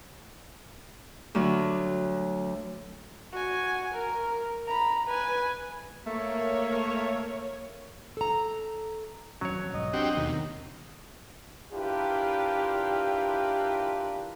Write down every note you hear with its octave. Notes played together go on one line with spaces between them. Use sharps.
D2 F#3 F#4
F#4 G#5
A#4
A#5 B5
B4 G#5
A3 A#3 C#5
A4 A#5
D#1 F2 F#3 C#4 C#5
B1 G#2 D#5
C4 D4 F#4 G4
D#2 B2
D4 E4 F4 G4 A#4 B4